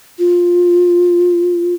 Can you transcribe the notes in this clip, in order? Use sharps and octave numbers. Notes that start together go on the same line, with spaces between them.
F4